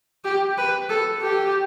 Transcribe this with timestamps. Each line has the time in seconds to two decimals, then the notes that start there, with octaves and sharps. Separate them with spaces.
0.25 G4
0.58 B4
0.90 A4
1.22 G4